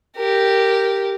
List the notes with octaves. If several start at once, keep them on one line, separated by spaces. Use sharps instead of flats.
G4 A#4